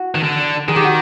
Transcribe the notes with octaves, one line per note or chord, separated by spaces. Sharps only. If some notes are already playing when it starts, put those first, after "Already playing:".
Already playing: E4 F#4
D#3
D3
D#3 G#4
G4
F#4